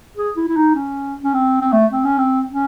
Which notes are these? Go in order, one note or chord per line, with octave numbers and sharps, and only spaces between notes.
G#4
E4
E4
D#4
C#4
C#4
C4
C4
A3
C4
C#4
C4
C#4